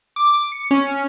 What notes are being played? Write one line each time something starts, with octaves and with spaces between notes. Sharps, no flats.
D6
C#7
C#4